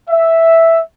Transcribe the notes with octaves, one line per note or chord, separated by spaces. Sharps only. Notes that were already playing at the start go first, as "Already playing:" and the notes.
E5